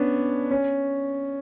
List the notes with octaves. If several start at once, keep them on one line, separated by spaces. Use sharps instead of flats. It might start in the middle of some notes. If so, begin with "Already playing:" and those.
Already playing: B3 C#4 D4
C#4